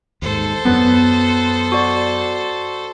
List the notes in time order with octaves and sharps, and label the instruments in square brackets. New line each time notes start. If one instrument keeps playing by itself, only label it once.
[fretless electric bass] D#2 G#2 [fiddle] A4 C5
[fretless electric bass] F#2 F#3 [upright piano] B3
[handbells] F#4 D5